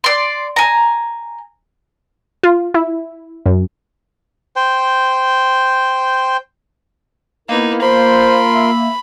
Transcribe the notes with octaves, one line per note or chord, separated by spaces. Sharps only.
D5 C6
G#5 A#5
F4
E4
F#2
C5 G5
A#3 B3 D#4 E4 A#4
F4 A#4 C5 B5 C6
E5